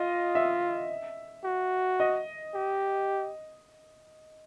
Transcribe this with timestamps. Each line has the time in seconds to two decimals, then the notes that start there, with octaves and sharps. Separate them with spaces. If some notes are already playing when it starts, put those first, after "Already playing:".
Already playing: F4 D#5
0.35 E5
1.44 F#4
2.00 D#5
2.55 G4